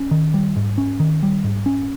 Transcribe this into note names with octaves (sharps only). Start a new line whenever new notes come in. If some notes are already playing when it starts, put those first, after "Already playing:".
Already playing: C#4
D#3
G3
G#2
C#4
D#3
G3
G#2
C#4